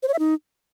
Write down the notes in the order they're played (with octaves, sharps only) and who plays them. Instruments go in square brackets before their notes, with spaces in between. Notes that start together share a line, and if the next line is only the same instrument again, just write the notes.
[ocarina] C5
C#5
E5
D#4